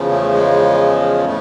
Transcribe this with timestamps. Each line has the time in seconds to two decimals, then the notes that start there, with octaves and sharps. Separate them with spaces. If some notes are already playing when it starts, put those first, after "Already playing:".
Already playing: E2 C#3 F3
0.11 A3
0.33 G#3
1.26 A2 A3